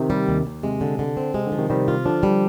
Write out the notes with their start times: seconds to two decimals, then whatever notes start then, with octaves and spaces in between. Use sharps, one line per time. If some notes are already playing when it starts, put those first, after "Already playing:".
Already playing: C3 D#3
0.10 G3
0.28 D#2
0.46 D#2
0.63 C3 G#3
0.81 D3
0.99 D3
1.17 C4
1.34 C3 G#3
1.47 D3
1.52 F3
1.58 C3 D#3
1.69 C3 D#3 G3
1.88 F4
2.05 D3 F3 D4
2.23 G3